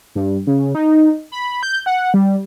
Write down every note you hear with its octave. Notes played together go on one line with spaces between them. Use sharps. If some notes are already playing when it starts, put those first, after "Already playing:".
G2
C#3
D#4
B5
G6
F#5
G3